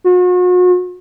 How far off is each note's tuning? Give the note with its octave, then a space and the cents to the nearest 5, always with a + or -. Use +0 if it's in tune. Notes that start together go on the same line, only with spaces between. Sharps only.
F#4 -40